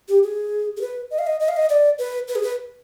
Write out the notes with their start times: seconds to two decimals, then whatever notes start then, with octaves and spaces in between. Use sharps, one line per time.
0.09 G4
0.23 G#4
0.77 G#4
0.81 B4
1.11 D#5
1.18 F5
1.27 D#5
1.40 D#5
1.48 F5
1.56 D#5
1.69 D5
1.99 B4
2.28 B4
2.35 G#4
2.43 B4